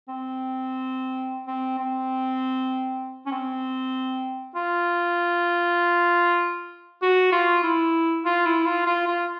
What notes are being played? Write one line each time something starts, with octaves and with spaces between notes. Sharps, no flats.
C4
C4
C4
C#4
C4
F4
F#4
F4
E4
F4
E4
F4
F4
F4